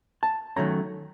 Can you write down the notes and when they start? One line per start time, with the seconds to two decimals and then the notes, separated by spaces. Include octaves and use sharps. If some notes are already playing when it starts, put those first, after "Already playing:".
0.23 A5
0.56 D#3 F#3 A3 C#4 A#5